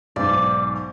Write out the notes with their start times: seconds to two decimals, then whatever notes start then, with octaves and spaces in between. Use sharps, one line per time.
0.16 B1 G#2 D5